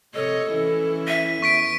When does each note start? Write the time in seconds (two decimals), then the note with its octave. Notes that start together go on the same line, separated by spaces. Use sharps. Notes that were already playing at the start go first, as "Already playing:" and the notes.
0.15 C3 A4 C#5 D#5
0.51 E3 C#4 E4
1.08 E5 D#7
1.42 E2 C#6 B6 D7